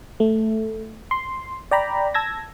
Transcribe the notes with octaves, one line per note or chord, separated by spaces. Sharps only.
A3
C6
D5 G5 A#5 B5
A5 E6 G#6 A#6